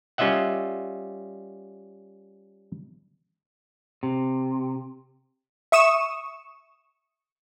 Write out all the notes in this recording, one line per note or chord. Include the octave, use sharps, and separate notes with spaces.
G3 C#4 F4 D#5 E5 F#5
C3
E5 C#6 D#6 E7